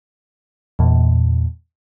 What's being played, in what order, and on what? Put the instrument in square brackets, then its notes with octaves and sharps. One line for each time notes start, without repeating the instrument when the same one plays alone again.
[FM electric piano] E2 A#2